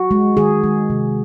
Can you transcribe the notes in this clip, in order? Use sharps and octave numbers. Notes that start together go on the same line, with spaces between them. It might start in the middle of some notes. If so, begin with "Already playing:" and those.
Already playing: F#4
G#3
D#3 G#4
G#3
C3